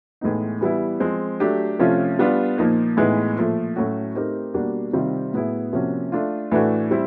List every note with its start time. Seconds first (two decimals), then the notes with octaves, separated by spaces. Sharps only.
0.21 A2 E3 G#3 B3 D#4
0.61 E3 G3 B3 E4
1.00 F3 G#3 C4
1.40 F#3 A3 D4 G4
1.79 C3 F3 A3 C#4 F4
2.19 G3 B3 D4 F4
2.58 A#2 F3 A#3 D#4
2.97 A2 E3 G#3 B3 D#4
3.36 A#2 F3 A3
3.76 A2 F#3 A3 C#4 F#4
4.15 A3 C4 D#4 G4 A#4
4.54 B2 G3 A#3 D4 F#4
4.93 C3 D#3 G3 C4 F4
5.33 A2 F#3 B3 E4 G#4
5.73 C3 F3 A#3 C#4 F#4
6.12 A3 D4 F4
6.51 A2 E3 A3 D4 F#4
6.91 G3 C4 E4